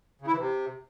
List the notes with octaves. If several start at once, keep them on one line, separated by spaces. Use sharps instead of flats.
C#3
E4
E3
C3